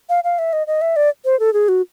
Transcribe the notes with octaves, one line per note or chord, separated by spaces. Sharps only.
F5
F5
E5
D#5
D#5
E5
D5
C5
A4
G#4
F#4